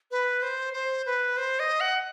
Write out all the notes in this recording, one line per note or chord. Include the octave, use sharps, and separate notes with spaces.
B4
C5
C5
B4
C5
D#5
F#5